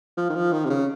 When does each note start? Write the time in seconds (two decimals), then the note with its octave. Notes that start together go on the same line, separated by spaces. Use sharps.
0.17 F3
0.30 D#3
0.35 F3
0.52 D#3
0.65 C3
0.70 C#3